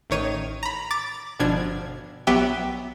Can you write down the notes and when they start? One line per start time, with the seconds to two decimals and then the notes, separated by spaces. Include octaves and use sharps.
0.10 A1 D#3 C#5 D#7
0.63 A#5 B5
0.91 D6 A6
1.39 G1 B2 F3 D4 G#6
2.27 A#1 F#3 B3 G4 E5 G5